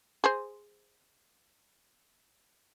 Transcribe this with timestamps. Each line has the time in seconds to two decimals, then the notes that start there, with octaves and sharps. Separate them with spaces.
0.24 G#4 C5